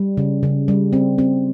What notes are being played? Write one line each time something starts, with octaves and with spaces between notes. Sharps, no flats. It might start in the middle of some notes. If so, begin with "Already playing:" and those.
Already playing: G3
C#3
C#3
G3
C4
C4